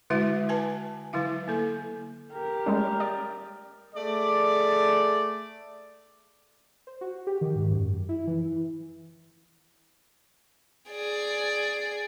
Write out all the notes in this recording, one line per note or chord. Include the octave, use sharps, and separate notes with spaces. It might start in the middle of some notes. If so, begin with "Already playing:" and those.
D3 G#3 E4 F#4 E5
B4 G#5 A5
D3 F#3 E4 F5
A#3 A4
G4 A#4
G3 G#3 C#4
D5
A3 G#4 D5
C5
F#4
G4
D#3
G#2
F#2
E4
E3
G#4 D5